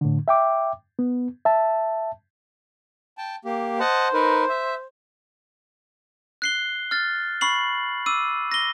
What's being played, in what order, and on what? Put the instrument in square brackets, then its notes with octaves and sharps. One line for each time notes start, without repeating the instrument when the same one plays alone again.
[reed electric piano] A2 D3
E5 G5 D6
B3
E5 A5
[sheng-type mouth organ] G5 A5
A#3 G4
[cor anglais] C5 [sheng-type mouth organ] D#5 F#5 A5
[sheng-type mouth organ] D#4 A#4 B4
E5
[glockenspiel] F#6 C7 G7
F6 A6
B5 C#6 C7 F#7
D6 E6 D#7
A#6 G7